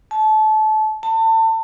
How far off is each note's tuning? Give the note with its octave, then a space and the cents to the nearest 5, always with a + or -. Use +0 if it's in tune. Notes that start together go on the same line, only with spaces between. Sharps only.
A5 -25
A5 +30